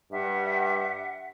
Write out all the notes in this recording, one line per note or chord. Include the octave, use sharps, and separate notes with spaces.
G2 E5 F#5